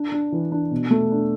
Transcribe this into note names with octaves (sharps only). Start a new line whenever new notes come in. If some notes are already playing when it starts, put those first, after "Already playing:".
Already playing: D4
D4
E3
D4
B2
A3
D4